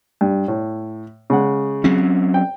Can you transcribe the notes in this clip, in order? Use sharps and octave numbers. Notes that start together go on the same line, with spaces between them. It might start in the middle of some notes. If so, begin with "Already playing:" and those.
G2
A2
C#3 G#3 F#5
F#3 C4 C#4
G5